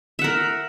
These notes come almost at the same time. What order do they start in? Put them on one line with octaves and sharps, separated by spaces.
E5 F#5 A#4